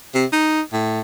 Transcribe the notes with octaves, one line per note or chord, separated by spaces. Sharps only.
C3
D#4
A2